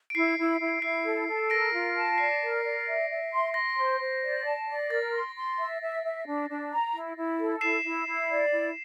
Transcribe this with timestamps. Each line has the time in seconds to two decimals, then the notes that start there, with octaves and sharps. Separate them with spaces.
0.10 D7
0.15 E4 C7
0.38 E4
0.60 E4
0.82 E4 C7
1.05 A4
1.27 A4
1.50 A#4 A#6 D7
1.73 F4
1.96 A5
2.18 D5 C7
2.42 A#4
2.64 D5
2.87 E5
3.10 E5
3.32 C6
3.54 C6 A#6
3.77 C5
4.00 C5
4.23 D5
4.45 A5
4.67 D5
4.90 A#4 A6
5.12 C6
5.36 C6
5.59 E5
5.81 E5
6.04 E5
6.26 D4
6.49 D4
6.71 A#5
6.94 E4
7.17 E4
7.39 A4
7.61 E4 C7 E7
7.84 E4
8.07 E4
8.30 D5
8.52 E4